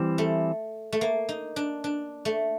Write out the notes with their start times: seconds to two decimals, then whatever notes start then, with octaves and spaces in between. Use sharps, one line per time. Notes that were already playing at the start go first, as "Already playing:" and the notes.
Already playing: E3 G3 C4
0.18 A3
0.92 A3
1.01 A#3
1.29 D#4
1.56 D4
1.84 D4
2.25 A3